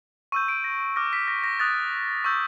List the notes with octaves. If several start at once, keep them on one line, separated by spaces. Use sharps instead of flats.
C#6 E6 G6 D#7
D7
A#6
D6 F6 A#6
B6
A#6
A#6
D#6 F#6 A6
C#6 E6 G6